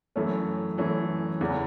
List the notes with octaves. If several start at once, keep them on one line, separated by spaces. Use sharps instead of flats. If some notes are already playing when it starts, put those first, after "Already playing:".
F#2 E3 A3 C#4
F#2 E3 A3 C#4
E2 C#3 E3